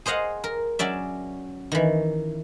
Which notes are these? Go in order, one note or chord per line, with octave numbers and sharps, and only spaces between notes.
G#4 C5 D#5 F5 F#5
A#4
F#3 C#4 D5 E5
D#3 E3